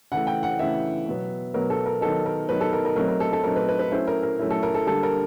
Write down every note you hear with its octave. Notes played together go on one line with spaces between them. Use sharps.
C#3 E3 A3 F#5
G5
F#5
C#3 E3 A3 E5
B2 F#3 B3
B2 F#3 B3 A#4
A4
A#4
D#3 F#3 B3 D#4 A4
A#4
D#3 F#3 B3 D#4 B4
A4
A#4
A#4
F#3 A3 C4 D#4 A#4
A#4
A4
A4
F#3 A3 C4 D#4 A#4
B4
B4
B4
F#3 A3 C#4 E4 C5
A#4
A#4
F#3 A3 C#4 E4
A4
A#4
A4
D3 G3 A#3 A4
A#4